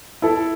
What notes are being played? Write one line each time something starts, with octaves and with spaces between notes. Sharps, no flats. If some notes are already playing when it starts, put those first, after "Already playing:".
E4 A4